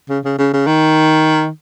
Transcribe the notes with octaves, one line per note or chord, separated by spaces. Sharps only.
C#3
C#3
C#3
C#3
D#3